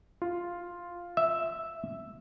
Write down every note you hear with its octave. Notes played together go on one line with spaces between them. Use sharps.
F4
E5